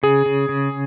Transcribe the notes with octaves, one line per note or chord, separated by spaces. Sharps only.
C#3 G#4
C#3
C#3